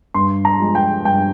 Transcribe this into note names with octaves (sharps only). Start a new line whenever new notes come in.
G2 C6
A#5
F3 G#3
G5
G2 G5